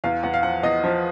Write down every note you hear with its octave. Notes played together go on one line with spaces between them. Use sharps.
E2 F5
E2 F#5
F5
F3 F#5
E2 D#5
F3